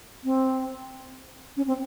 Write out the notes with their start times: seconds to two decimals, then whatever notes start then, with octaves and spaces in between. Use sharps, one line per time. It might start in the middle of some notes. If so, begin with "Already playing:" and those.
0.24 C4
1.57 C#4
1.67 C4